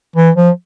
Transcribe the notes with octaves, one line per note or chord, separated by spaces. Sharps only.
E3
F3